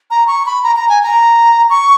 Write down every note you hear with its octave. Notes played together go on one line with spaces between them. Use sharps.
A#5
C#6
B5
A#5
A#5
G#5
A#5
C#6